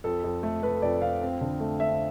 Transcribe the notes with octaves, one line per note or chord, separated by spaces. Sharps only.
F2 A4
F2
A3
A3 B4
F2 D5
F2 F5
C4
D3
A3
A3 E5